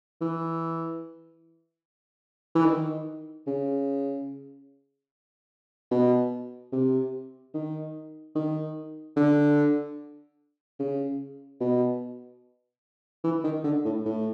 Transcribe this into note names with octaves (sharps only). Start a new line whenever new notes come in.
E3
E3
D#3
C#3
B2
C3
D#3
D#3
D3
C#3
B2
E3
D#3
D3
A2
A2